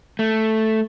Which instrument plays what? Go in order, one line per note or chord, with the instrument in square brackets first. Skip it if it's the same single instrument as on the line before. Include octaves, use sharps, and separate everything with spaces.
[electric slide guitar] A3